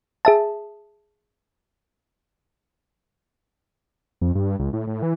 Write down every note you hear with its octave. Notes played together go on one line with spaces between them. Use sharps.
G#4 E5 A5
F2
G2
C#2
A2
A2
E3